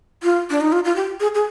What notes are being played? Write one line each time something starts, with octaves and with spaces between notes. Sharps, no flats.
F4
D4
D#4
F4
F4
G4
G#4
G#4